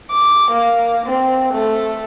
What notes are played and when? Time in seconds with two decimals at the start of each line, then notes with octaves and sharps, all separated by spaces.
0.11 D6
0.51 A#3
1.06 C4
1.53 A3